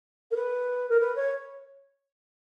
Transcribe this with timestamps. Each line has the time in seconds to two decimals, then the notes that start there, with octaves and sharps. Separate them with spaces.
0.31 A#4
0.36 B4
0.89 A#4
1.00 B4
1.16 C#5